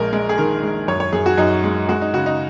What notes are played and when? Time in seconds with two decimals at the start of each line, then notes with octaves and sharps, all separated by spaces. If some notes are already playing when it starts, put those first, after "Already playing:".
Already playing: A#1 G#3 A#4
0.13 G#3
0.29 G#4
0.38 D#3 A#4
0.63 G#3
0.88 F#2 C#5
1.00 C#5
1.12 F#2 G#4
1.26 F#4
1.38 F#2 D#4
1.64 G#3
1.89 G#3 F#4
2.02 D#4
2.13 C#3 F#4
2.26 D#4